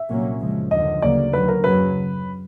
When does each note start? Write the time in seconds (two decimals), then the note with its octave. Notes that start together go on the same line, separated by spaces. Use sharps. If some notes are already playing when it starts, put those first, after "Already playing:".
Already playing: E5
0.09 C2 A#2 F#3 A#3 C#4
0.40 F#2 C#3 F3 G#3
0.71 D#2 D3 F3 D#5
1.02 D2 C#3 F#3 A#3 D5
1.33 D#2 D3 F#3 B4
1.48 A#4
1.64 F#2 C#3 F#3 B4